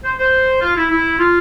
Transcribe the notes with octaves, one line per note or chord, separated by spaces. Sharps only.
C5
C5
F4
E4
E4
F4